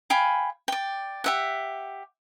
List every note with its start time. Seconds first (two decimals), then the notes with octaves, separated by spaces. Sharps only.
0.10 F5 G5 G#5 B5
0.68 D5 G5
1.24 G4 E5 F#5